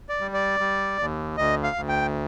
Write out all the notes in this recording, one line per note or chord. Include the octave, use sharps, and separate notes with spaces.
D5
G3
D5
G3
D#2
D2 D#5
F5
D2
G5